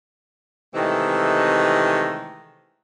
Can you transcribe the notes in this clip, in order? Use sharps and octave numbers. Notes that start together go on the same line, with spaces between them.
C3 D#3 E3 G#3 A3 C4